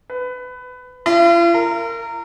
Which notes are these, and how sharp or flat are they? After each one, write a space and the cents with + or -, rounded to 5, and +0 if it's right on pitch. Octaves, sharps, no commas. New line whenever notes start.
B4 +20
F4 -45
A#4 -20